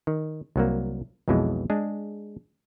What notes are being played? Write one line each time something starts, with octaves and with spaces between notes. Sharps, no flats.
D#3
C2 F#3 A#3
B1 F2 B2 E3 G#3
G#3 D4 G#4